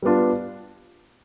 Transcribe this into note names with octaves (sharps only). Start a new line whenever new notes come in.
G3 B3 D4 F4